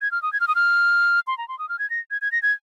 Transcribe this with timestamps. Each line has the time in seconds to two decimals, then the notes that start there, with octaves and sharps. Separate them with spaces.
0.02 G#6
0.11 F6
0.22 D#6
0.33 G#6
0.40 F6
0.48 D#6
0.55 F6
1.27 C6
1.38 A#5
1.48 C6
1.59 D#6
1.69 F6
1.79 G#6
1.90 A#6
2.11 G#6
2.22 G#6
2.32 A#6
2.42 G#6